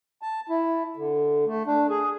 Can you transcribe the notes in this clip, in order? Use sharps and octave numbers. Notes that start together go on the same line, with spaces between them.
A5
E4
D3
A3
D4
G#4